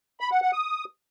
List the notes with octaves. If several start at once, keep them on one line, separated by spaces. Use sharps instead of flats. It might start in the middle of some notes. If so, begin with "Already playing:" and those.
B5
F#5
F#5
D#6